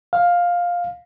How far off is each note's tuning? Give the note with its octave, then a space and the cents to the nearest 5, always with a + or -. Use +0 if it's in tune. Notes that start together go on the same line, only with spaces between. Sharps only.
F5 +10